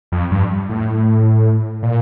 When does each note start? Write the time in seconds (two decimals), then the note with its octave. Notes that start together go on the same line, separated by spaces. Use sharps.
0.12 F2
0.31 G2
0.69 A2
1.83 A#2